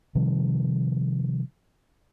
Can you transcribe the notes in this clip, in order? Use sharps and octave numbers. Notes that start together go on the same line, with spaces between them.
C3 D#3 F3 G3